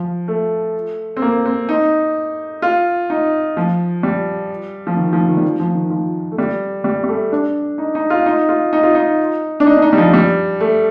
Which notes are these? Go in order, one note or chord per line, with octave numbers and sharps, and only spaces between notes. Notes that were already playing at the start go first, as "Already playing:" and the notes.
Already playing: F3
A3
C4
A#3
C4
D#4
F4
D#4
F3
G3
F3
D#3
F3
D#3
G3
F3
F3
D#3
F3
A3
G3
G3
G3
A3
D4
D#4
D#4
F4
D#4
F4
D#4
F4
D#4
D4
D#4
D4
D#4
G3
F3
G3
A3